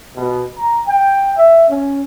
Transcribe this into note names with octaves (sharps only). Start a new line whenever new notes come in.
B2
A#5
G5
E5
C#4